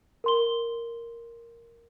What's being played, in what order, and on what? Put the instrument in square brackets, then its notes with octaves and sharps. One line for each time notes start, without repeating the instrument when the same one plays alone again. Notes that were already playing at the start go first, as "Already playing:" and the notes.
[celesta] A#4 C6 G7